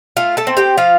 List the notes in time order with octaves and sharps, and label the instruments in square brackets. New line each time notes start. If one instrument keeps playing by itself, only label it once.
[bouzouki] A3 F4 F5
A4 A5
C4
G4 G5
F3 F4 F5